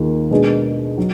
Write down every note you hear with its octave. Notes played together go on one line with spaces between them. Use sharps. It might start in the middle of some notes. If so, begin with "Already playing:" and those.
Already playing: D#2 D#3 A#3 F4 G#4
B2 G#3 D4 G#4
F#3